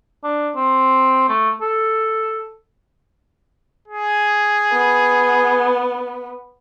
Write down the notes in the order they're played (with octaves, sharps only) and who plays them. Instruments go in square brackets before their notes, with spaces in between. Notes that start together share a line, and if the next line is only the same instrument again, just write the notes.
[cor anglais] D4
C4
A3
A4
[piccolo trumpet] G#4
[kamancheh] B3